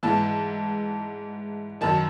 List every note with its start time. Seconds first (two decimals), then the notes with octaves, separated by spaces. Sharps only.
0.03 G#2 E3 A5
1.81 F#2 D#3 A5